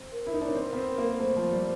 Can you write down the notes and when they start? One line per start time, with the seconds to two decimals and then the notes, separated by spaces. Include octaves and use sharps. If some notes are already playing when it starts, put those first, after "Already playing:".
Already playing: C4
0.13 A#4
0.27 E4
0.33 D#4 A#4
0.41 D4
0.48 C#4
0.55 C4 A#4
0.73 B3
0.77 C4
0.98 A#3
1.19 A3 C5
1.36 F3
1.52 G3